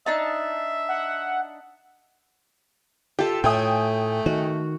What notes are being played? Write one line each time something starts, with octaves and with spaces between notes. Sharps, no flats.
D4 D#4 E5 A5
F#5
F4 G4 A4
A2 A3 G5 G#5 D#6
D#3 F#4